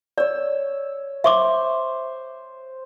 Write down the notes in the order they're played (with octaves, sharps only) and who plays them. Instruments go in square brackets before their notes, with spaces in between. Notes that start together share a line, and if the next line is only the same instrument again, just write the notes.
[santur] C#5 E6 [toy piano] D5
[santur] C5 [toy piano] E5 C#6 D6